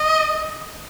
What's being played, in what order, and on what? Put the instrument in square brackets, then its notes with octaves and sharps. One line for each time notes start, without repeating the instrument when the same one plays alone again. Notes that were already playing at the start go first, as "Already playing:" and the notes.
Already playing: [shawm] D#5